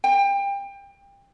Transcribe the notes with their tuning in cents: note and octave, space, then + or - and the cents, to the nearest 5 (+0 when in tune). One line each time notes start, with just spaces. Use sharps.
G5 +25